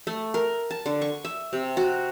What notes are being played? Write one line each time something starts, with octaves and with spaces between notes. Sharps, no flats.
A3
A#4
A5
D3
C#6
E5
C3
F#4